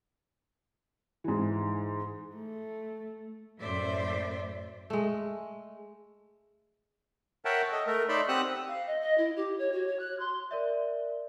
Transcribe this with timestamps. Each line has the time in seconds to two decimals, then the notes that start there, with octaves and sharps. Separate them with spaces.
1.24 G#2 E3
2.35 A3
3.60 F#2 A2 C5 D5 E5
4.90 G#3 A3
7.45 A#4 C#5 E5 F#5 G5 A5
7.72 A4 D#5
7.87 A3 A4 A#4
8.09 D#4 C#5 D5 E5 B5 C6
8.28 C4 G4 F#5 D#6 E6 F#6
8.68 F5
8.86 D#5
9.01 D#5
9.17 E4
9.36 G4
9.58 C#5
9.72 F#4
9.87 C#5
9.99 F#6
10.19 C6
10.51 A#4 D5 E5